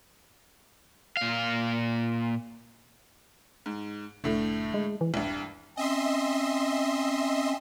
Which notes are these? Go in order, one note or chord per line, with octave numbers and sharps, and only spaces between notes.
A#2 F5
G#2
F1 A2 D3 A3
G#3
E3
D#1 C2 G2
C4 C#4 D#5 E5 C6